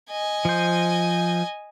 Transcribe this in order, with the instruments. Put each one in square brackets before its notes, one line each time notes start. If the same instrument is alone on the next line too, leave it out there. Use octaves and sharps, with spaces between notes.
[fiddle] D#5 G#5
[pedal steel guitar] F3 C5